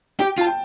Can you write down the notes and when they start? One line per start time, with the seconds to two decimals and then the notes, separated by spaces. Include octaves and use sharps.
0.19 G4 G5
0.38 F4
0.41 A5
0.47 G5